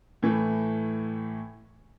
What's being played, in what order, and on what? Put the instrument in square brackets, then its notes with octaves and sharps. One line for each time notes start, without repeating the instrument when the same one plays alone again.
[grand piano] A2 E3 A3